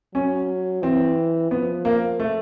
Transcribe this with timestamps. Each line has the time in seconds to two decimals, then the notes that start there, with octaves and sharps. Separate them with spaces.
0.14 F#3 C#4
0.82 E3 C4
1.51 F3 B3
1.85 A#3
2.20 A3